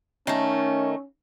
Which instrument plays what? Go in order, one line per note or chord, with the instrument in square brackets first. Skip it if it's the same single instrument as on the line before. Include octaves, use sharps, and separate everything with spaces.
[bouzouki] D#3 A3 [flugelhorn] C#4